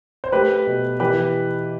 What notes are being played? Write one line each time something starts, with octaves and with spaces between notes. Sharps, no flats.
C5
A3 G4 B4
B2
E3 G4 B4